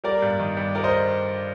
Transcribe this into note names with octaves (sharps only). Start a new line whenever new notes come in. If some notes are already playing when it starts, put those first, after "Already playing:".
G3 A#4 D5
G2
D#3
G2
G3 A#4 D5
C5 D#5